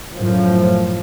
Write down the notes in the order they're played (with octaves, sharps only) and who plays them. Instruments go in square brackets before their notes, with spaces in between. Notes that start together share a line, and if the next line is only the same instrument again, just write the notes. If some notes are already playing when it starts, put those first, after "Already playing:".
[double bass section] F#2 A2 F3